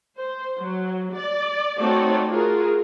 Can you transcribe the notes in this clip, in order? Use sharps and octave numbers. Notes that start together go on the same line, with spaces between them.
C5
F#3
D5
A3 C4 D#4 F#4 C#5 D5
F4 F#4 G#4 A#4